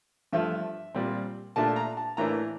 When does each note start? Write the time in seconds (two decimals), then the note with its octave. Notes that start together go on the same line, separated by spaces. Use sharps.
0.33 G2 F3 A3 E5
0.95 A#2 G3 C4
1.56 A#2 A3 D4 A5
1.76 A#5
1.97 A5
2.17 A2 E3 A#3 D4 A#5